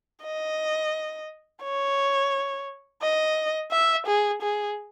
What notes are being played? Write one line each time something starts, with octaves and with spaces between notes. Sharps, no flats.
D#5
C#5
D#5
E5
G#4
G#4